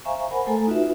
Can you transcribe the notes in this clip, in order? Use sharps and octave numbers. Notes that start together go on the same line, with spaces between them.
C5 E5 F5 G#5 A#5 C#6
A#4 C5 F#5 G#5 B5
A3 A4 G#5 A#5
D#4 F4 F#4 B4 E5